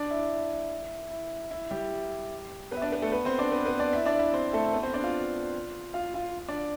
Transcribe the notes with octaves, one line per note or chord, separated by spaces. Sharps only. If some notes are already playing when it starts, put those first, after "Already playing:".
Already playing: D4 D5
E4
E4
E4
G3 G4
B3 B4
E5
D4 D5
B3 B4
A3 A4
B3 B4
C4 C5
D4 D5
B3 B4
B3 B4
D4 D5
E4 E5
D4 D5
E4 E5
C4 C5
A3 A4
B3 B4
C4 C5
D4 D5
F4 F5
F4 F5
F4 F5
D4 D5